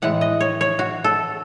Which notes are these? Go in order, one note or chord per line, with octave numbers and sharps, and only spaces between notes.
A2 E3 G#3 F#5
D#5
C#5
C#5
F#4
A4